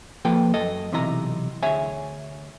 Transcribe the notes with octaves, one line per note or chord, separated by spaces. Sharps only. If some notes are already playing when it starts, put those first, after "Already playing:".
F3 A#3 A4 B4 G5
F#2 A4 D#5
B1 C3 E3 E4 D#5 A#5
D2 G#4 C#5 E5 G#5